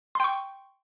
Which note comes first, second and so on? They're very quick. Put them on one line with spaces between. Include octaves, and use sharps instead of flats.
C6 G5 C#6